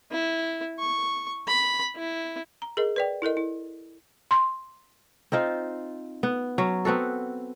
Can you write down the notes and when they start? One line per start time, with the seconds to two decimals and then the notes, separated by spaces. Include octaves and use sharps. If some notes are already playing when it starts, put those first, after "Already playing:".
0.11 E4
0.79 C#6
1.48 B5
1.96 E4
2.62 A#5
2.77 G#4 A#4 D#5
2.96 B4 D5 G5
3.22 E4 A4 A#4 D#5
3.37 E4
4.31 C6
5.32 C4 D#4 F4 C5
6.23 B3
6.58 F#3 C#4
6.85 B3 C4 F#4 A4